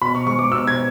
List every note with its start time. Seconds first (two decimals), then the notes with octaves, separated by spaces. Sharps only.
0.02 B2 B5
0.15 C#6
0.27 G#3 C#6
0.39 D6
0.51 B2 E6
0.67 G#6